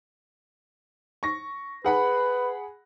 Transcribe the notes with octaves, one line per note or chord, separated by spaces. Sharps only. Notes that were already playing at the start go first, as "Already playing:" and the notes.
C#6 A#6
G#4 B4 F#5 B5